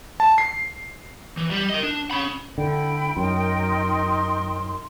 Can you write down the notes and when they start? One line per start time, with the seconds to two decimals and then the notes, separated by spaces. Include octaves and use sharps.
0.20 A5
0.38 C7
1.37 E3
1.50 G3
1.70 A#4 D#5
1.83 D4
2.11 C#4 B5
2.58 D3 E4 G5 B5
3.17 F#2 D#4 A#4 C6